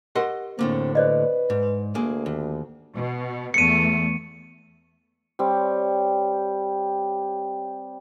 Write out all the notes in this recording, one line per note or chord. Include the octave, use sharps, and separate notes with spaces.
G4 A#4 D#5 F#5 C6
A2 D3 A#3 C4
B4 C5 D5 D#5
G#2
D2 A#3 G#4
D#2
B2
E2 A3 B3 C#7 D#7
G3 C4 C#5